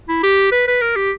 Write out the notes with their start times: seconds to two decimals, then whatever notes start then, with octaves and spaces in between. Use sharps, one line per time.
0.08 E4
0.23 G4
0.52 B4
0.68 B4
0.82 A#4
0.96 G4